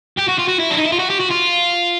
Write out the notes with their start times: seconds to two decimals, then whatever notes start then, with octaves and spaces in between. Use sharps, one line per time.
0.18 G4
0.29 F#4
0.39 F4
0.48 F#4
0.60 E4
0.70 D4
0.78 D#4
0.85 E4
0.92 F4
0.99 F#4
1.10 G4
1.20 F#4
1.30 F4